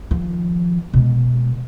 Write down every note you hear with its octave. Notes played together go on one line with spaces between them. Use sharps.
D#3 F3
B2 G#3